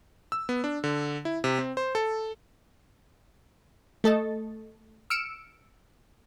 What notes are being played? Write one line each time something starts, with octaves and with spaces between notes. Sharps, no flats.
E6
B3
D4
D3
E4
C3
C4
C5
A4
A3 A4 D#5 A6
E6 F6 C#7 D7 E7